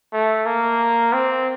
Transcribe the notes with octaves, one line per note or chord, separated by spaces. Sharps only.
A3
A#3
C4